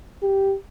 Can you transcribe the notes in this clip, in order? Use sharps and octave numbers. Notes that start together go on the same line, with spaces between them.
G4